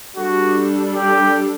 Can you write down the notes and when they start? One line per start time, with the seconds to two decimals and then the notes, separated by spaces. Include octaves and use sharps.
0.16 G3 D4 F#4 A4
0.96 G4